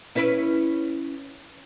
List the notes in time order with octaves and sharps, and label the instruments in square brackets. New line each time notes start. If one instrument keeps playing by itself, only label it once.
[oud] C#4 E4 B4